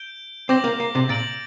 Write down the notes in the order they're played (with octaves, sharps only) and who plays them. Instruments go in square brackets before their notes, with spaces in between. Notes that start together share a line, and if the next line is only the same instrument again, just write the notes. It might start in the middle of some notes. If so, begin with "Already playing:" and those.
Already playing: [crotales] G6 D7 G7
[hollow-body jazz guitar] C4 [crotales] D6 G6 A#6 F#7
[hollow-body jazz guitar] A#3
A#3
C3
[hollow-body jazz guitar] A#2 [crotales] A6 D7 F#7